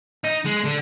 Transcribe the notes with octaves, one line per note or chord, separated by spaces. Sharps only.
D#4
G#3
D3